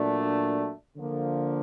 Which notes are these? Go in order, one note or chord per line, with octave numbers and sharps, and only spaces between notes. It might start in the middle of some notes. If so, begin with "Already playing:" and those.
Already playing: A#2 F#3 A3 D4
D3 F3 A#3